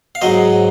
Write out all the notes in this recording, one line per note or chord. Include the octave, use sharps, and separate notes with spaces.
F5
G#2 F#3 C5 D#5